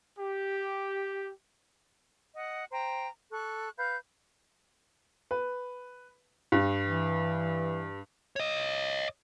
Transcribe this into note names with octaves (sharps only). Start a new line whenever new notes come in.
G4
D#5 F#5
C5 G5 A#5
A4 C#6 F#6
B4 F5 G6
B4
G2
E3
C#5 D#5